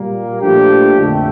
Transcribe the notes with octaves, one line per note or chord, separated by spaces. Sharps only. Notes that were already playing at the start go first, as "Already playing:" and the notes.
Already playing: A#2 G3 A#3
A#2 F3 A3 D4 G4
F2 D3 A3